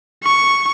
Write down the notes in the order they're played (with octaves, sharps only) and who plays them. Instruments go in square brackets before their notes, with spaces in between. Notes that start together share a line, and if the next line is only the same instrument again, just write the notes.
[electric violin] C#6